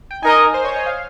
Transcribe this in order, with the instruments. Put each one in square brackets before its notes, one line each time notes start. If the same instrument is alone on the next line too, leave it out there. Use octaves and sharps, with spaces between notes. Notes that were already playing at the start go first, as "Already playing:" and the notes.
[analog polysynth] G5
[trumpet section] D#4 A#4 D#5 [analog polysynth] G#5
[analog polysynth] C5
C#5
D#5
F5